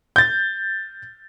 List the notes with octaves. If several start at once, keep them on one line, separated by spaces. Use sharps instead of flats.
G6 A6